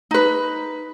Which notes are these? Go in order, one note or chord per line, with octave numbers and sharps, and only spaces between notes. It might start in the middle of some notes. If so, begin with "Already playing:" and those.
D#4 B4